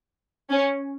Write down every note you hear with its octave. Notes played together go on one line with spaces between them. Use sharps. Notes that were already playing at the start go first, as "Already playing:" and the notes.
C#4